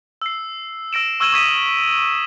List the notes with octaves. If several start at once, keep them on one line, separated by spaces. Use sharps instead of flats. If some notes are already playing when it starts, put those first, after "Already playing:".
E6 C7
E6 A#6 D7 E7
C#6 E6 F6 G#6 D#7 E7
C#6 D#6 G#6 B6 D#7